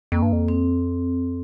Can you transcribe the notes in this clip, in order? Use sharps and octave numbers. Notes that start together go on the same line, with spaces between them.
F2 A#3
G2
F2
C4